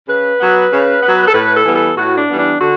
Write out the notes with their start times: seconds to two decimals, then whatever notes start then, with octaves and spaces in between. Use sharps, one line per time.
0.08 C#3 B4
0.40 F#3 B3
0.71 C#3
1.02 F#3 B3
1.27 A4
1.34 A2 B4
1.55 A4
1.65 E3 G3 B3
1.76 A4
1.97 A2 F#4
2.18 D4
2.29 E3 G3 B3
2.39 D4
2.59 D3 F#4